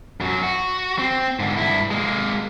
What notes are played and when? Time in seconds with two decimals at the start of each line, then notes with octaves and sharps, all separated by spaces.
0.21 F#2 F#3
0.43 F#4
0.99 C4
1.40 G#2 D3
1.57 G2 E4
1.91 G#3 A#3